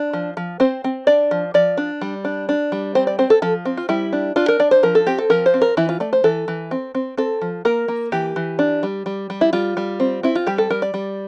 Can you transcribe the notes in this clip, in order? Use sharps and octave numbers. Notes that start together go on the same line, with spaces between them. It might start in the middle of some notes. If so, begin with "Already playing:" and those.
Already playing: D4
F3
F3
C4 C5
C4
D4 D5
F3
F3 D5
D4
G3
D4
D4
G3
C4 C5
D5
C4 C5
A4
F3 A4
C4
F4
G3 E4
D4
D4 F4
A#4
D4 D5
C5
F3 A#4
A4
C4 G4
A4
F3 A#4
C5
C4
A#4
E3 E4
F4
A3 D5
C5
E3 A4
E3
C4
C4
C4 A4
F3
A#3 A#4
A#3
E3 G4
E3
D4
G3
G3
G3
E4
G3 F4
G3
C4
C4 E4
F4
G3 G4
A4
G3 A#4
D5
G3